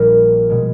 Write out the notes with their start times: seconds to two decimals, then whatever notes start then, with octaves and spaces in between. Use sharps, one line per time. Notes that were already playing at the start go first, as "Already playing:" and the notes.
Already playing: A#1 A#2 G3 A#4
0.50 B2 G#3